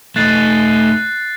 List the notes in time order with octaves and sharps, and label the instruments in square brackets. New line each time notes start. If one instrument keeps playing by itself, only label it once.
[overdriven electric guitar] A3 D#4 [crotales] F#6 A6 C7